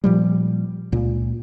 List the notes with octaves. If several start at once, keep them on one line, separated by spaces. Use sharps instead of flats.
A#2 F3 G3
C#2 A#2